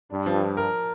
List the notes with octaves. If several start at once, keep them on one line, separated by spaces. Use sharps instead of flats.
G2 D4
F3
F3
A#4